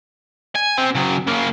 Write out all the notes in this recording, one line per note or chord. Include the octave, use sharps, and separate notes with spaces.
G#5
C4 G4
C#3 F#3
C#3 A#3